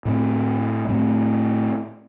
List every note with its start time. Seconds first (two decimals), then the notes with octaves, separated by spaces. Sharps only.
0.05 A2 A3 C4
0.88 A2 A3 C4